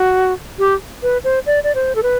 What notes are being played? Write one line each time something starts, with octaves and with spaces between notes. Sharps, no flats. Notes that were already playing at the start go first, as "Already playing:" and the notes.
Already playing: F#4
G4
B4
C5
D5
D5
C5
A4
B4